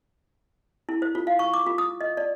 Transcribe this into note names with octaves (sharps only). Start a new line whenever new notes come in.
E4
C5
F4
F5
C#6
D6
F4
D#6
D#5
D5